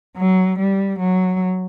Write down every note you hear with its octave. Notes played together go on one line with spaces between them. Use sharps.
F#3
G3
F#3